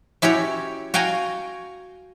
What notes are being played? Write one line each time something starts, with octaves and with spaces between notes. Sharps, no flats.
C#4 E4 F#4 G4 C#5
F#4 F5 G5 G#5 A#5